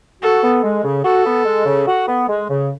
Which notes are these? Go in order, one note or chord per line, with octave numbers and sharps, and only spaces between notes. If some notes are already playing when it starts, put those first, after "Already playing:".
F#4 A4
B3
G#3
C#3
F#4 A4
B3
G#3
C#3
F#4
B3
G#3
C#3